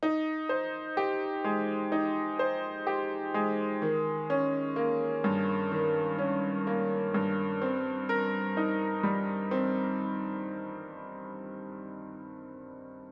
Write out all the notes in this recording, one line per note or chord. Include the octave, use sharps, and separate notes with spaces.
D#4
C5
G4
G#3
D#4
C5
G4
G#3
D#3
C#4
A#3
G2
D#3
C#4
A#3
G2
C4
A#4
D#4
G3
C4